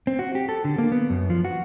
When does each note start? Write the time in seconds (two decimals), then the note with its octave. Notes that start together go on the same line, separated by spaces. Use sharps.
0.07 C4
0.19 F#4
0.35 G4
0.49 A4
0.65 D3
0.78 A#3
0.92 B3
1.10 F#2
1.30 F3
1.45 F#4